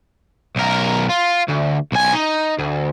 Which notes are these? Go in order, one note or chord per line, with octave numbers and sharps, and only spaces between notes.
B1 A#4
F4
D2
B1 G#5
D#4
D2